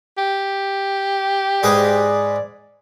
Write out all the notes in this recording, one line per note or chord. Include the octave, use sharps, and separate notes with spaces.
G4
G#2 G#4 B4 D5